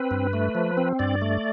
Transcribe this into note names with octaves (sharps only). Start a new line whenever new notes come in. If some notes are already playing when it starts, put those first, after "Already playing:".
Already playing: C4 B4
G2
A3
F3
C4
G2 D5
A3